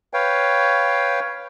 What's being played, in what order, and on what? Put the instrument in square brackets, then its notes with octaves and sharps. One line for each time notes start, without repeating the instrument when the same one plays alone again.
[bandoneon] B4 C#5 F5 G5